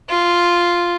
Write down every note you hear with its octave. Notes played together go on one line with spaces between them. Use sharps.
F4